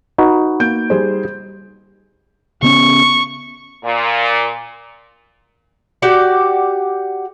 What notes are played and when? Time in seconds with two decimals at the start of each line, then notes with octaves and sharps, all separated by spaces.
0.18 D#4 F#4 B4
0.60 A#3 G6 D7
0.90 G3 G#4 C5
2.62 C#3 B3 C#4 C#6
3.85 A#2
6.02 F#4 G4 D5 F#5